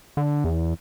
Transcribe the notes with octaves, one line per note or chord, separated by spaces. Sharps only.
D3
E2